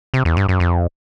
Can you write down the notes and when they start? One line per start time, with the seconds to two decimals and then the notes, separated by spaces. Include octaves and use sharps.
0.14 C3
0.25 E2
0.37 G2
0.49 F#2
0.60 F2